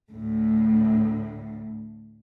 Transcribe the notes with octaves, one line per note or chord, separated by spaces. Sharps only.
D2 A2